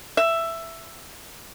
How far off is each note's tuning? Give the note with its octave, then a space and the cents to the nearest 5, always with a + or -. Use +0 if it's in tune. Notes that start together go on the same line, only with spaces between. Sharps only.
E5 +10